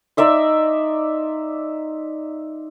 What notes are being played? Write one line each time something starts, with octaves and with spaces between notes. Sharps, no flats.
D#4 D5 E5 C6